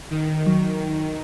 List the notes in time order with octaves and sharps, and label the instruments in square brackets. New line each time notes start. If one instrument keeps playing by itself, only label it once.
[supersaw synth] D#3
[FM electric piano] F#3